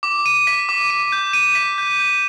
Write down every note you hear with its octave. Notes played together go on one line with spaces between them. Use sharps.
D6
D#7
B6
D6
D#7
G6
D#7
B6
G6
G6